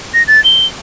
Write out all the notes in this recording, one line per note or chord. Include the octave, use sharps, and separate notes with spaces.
A#6
A6
G7